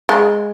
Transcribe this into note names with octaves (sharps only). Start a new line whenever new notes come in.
G#3